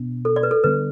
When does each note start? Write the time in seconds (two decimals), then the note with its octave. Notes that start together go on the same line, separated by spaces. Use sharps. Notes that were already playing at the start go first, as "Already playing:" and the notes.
Already playing: B2 B3 D4
0.25 A4
0.36 D5
0.43 B4
0.51 A4
0.64 D3 G3 B3 D4 B4